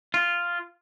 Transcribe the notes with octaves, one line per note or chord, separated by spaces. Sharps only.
F4